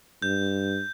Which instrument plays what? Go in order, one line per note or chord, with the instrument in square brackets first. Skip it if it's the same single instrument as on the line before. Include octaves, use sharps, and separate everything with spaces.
[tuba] G2 [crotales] G6